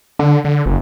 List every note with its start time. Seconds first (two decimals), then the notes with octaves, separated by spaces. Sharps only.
0.19 D3
0.44 D3
0.66 F#1